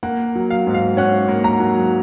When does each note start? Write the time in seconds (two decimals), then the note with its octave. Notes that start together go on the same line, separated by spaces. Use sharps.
0.03 A#3 F#5
0.35 F#3
0.50 F5
0.67 G#2
0.74 F5
0.97 C#4 F#5
1.28 A#3
1.44 A#5
1.60 F#3